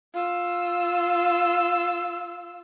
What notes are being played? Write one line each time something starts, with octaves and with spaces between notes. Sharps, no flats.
F4 E6